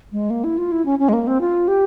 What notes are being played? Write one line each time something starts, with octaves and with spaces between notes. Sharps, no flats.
G#3
A#3
E4
F4
E4
C#4
C#4
G#3
A#3
C4
F4
G4